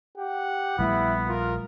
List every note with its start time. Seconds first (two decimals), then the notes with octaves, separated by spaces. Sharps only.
0.18 G4 F#5
0.79 A#1 G3 A3 B3 E4
1.28 F4 A#4